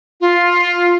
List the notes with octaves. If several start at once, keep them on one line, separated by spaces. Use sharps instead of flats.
F4